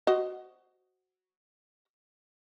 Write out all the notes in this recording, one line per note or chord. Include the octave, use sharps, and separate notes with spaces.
F#4 C5 D#5